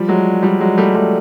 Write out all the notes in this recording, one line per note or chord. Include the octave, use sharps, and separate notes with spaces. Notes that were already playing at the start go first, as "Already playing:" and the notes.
Already playing: F3 G3
F#3 G#3
F3 G3
F#3 G#3
G3 A3
G3 A3